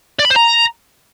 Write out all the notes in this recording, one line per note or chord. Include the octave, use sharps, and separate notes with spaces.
D5
B5
C5
A#5